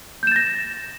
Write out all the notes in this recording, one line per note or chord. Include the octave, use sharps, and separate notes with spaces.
G6 A6 A#6 E7